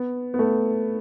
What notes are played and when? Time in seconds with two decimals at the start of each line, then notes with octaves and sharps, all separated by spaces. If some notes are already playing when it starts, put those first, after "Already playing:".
Already playing: B3
0.34 B3
0.39 A3